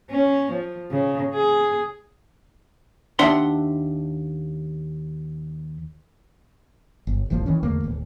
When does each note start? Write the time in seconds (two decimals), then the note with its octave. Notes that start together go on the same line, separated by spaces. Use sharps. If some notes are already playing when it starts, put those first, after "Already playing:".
0.11 C#4
0.52 F3
0.91 C#3
1.34 G#4
3.19 D#2 D4 E5 F#5 C6
7.07 G1
7.30 E1 A1 F3 A#3
7.46 D#3 E3 C#4
7.63 E2 D3 A3 A#3
7.84 D1